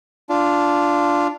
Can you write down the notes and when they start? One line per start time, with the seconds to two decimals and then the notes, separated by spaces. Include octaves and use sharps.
0.29 D4 F4